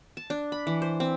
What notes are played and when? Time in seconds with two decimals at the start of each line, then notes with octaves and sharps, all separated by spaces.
0.17 A5
0.30 D4
0.52 B5
0.67 E3
0.82 C5
1.00 C4